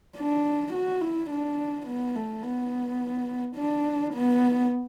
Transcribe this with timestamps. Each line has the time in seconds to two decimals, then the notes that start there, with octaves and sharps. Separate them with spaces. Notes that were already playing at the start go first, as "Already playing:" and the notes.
0.17 D4
0.74 F#4
1.02 E4
1.30 D4
1.88 B3
2.15 A3
2.43 B3
3.56 D4
4.14 B3